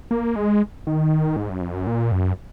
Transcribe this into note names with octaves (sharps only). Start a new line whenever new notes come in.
A#3
G#3
D#3
G#2
F#2
F2
F#2
A#2
F#2